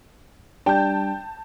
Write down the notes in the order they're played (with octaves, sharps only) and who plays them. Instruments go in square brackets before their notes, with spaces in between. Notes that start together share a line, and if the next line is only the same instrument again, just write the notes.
[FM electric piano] G3 D4 [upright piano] G5 [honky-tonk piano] A5 G6